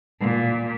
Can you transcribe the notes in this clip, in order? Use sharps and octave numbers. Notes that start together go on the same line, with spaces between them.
A#2